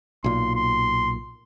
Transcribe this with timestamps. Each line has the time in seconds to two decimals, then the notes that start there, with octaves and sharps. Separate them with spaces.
0.24 B1 A#2 C6
0.55 C6